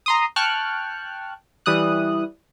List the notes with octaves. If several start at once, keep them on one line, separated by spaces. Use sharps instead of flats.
A#5 C6 D#6
G5 A5 C#6 F6 F#6
E3 G3 D#6 F#6